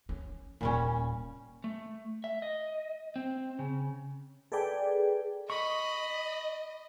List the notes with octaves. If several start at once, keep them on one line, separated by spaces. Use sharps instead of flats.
C#4
D#1 A#2 G3 C#4
A3
E5
D#5
C4
C#3
G#4 A4 B4 D5 G5
D#5 B5 C#6